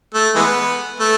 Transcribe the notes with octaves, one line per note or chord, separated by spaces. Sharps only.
A3
E3 G#3 B3
A3